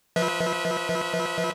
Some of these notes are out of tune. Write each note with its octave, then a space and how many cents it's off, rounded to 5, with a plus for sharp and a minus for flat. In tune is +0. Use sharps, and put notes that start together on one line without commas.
F3 +0 B4 -15 E5 -35